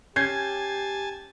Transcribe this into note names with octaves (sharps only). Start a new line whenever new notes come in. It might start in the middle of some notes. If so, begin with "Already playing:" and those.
C#4 G4 G#5 A5 G6 G#6 C7